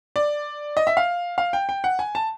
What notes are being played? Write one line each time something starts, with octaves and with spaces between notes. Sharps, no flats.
D5
D#5
E5
F5
F5
G5
G5
F#5
G#5
A5